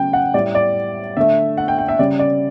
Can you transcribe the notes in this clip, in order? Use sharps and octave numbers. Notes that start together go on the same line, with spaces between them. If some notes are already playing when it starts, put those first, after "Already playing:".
Already playing: C#3 F#3 A3 G5
F#5
A2 G3 D5
D5
D3 A3 E5
F#5
G5
G5
E5
C#3 G3 D5
D5